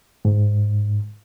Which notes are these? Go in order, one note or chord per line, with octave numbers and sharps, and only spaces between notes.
G#2